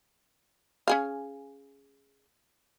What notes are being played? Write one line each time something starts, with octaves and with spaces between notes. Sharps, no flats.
C#4 G#4 F5